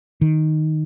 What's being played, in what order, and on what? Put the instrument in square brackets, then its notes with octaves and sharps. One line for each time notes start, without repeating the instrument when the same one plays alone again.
[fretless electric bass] D#3